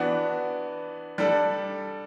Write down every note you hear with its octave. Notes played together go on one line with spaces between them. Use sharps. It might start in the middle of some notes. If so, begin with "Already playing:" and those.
Already playing: E3 B3 D4 F#4
G3 D4 A4